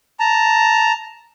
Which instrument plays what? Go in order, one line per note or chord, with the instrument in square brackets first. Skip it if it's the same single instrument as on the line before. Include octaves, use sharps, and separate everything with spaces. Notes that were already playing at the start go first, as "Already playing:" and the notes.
[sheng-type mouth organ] A5 A#5